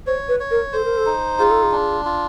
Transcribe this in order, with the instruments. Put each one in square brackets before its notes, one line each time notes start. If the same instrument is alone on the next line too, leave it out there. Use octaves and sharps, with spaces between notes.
[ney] C5 [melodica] C#5
[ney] B4
[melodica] C#5
[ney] A#4
[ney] A4 [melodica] C5
[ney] A#4
A4
[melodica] D#4
[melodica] F4 [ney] G#4
[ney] A4
G#4
[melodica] D4
F4